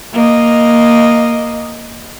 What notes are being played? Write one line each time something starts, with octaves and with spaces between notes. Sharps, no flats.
A#3 D#5